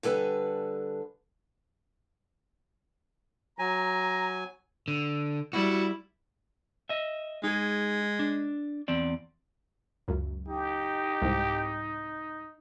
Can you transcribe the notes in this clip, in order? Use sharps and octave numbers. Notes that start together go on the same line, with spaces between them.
D3 G3 A4 B4 G#5
F#3 G#5 A#5
D3
G3 E4 F#4
D#5 E5
G#3 D#4 G#4
D4
E2 C4 D5
C#2 F#2
D#4 G4
C2 G#2